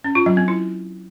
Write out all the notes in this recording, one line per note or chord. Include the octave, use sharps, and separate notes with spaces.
C#4
F4
F#3
C4
E4